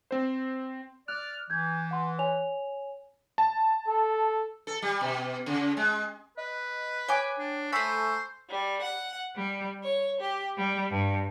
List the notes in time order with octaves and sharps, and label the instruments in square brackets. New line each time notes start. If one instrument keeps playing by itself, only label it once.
[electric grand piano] C4 C5
[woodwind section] D5 F6 [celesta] F#6
[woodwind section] E3 [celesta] G6 G#6
[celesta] F#5 C6
C#5 G#5 F7
[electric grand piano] A5
[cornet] A4
[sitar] A4
G3
B2
C#3
G#3
[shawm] B4 [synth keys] D#5
[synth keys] C#5 [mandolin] G5 G#5 D6
[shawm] D4
[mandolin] A3 B5 [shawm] C5 [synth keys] G#5 C#6 E6
[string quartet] G3
F#5
G3
C#5
G4
G3
G2